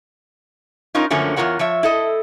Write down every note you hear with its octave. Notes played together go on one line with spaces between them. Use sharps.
C#4 D#4 F4 A#4
F#2 D3 F3 A3 A#3 C#4
E2 E3 F4 A#4 C#5 F#5
F3 C#5 E5
E4 A4 D#5